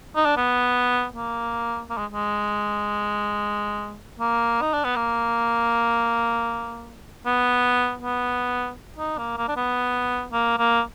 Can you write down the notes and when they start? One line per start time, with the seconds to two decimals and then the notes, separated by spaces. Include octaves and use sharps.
0.16 D#4
0.25 D4
0.37 B3
1.14 A#3
1.89 A#3
1.98 G#3
2.12 G#3
4.19 A#3
4.62 D#4
4.74 D4
4.84 B3
4.96 A#3
7.26 B3
8.02 B3
8.98 D#4
9.18 A#3
9.37 A#3
9.48 D4
9.56 B3
10.32 A#3
10.58 A#3